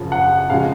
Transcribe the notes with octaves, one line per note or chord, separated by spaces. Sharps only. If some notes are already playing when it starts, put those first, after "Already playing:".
Already playing: F#2 C#3 F3
F#5
C#3 F3 G#3 F5